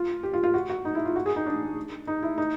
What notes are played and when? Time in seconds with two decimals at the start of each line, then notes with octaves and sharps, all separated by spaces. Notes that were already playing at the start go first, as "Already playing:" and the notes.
Already playing: F4
0.23 G4
0.34 F4
0.44 F4
0.54 F#4
0.69 F#4
0.85 D#4
0.95 E4
1.05 F4
1.16 F#4
1.26 G#4
1.36 D#4
1.46 D4
2.07 D#4
2.23 E4
2.38 D#4